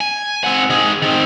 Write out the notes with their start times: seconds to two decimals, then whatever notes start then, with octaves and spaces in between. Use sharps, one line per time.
0.01 G#5
0.44 C4 F#5
0.70 D#3 G#4
1.02 D#3 C4